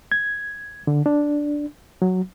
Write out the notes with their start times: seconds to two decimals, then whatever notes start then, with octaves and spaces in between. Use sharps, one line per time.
0.12 G#6
0.87 D3
1.06 D4
2.02 F#3